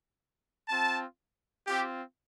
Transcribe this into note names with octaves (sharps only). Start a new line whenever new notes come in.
C4 F4 A5
C4 F4 G4